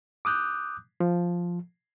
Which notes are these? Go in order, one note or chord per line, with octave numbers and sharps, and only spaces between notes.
D6 D#6 F#6 G6
F3